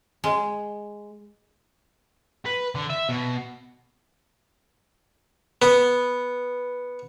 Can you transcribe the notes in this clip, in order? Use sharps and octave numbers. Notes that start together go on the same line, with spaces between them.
G#3
B4
D3
E5
B2
B3